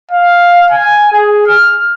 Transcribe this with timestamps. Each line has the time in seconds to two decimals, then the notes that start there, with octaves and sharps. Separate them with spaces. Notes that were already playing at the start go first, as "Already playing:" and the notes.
0.11 F5
0.71 G#5
1.12 G#4
1.47 F6